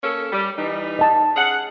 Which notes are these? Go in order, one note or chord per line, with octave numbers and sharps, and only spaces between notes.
A#3 C#4 A4
G3
E3 G3 D#4
D#5 A5
C#4 G#4 F#5